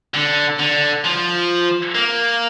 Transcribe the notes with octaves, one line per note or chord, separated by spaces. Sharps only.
D3
D3
F3
A#3